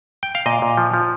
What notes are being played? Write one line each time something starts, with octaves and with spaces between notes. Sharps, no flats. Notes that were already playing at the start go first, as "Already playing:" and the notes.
G5
F5
A#2 D#5
A#2
F3
F3